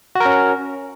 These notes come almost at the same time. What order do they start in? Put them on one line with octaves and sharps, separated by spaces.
F#4 A#4 C#4